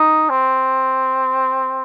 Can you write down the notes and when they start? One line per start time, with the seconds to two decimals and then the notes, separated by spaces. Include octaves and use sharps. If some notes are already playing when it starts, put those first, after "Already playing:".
Already playing: D#4
0.29 C4